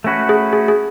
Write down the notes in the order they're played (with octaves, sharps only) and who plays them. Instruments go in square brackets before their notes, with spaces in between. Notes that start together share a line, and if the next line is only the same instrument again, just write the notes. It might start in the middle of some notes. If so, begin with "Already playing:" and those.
[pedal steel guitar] A3 C#4 F#4 B4
[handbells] G#4
G#4
G#4